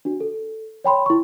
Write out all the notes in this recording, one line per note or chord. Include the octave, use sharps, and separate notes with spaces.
D4 F#4
A4
C#5 G5 B5 C6
E4 C#6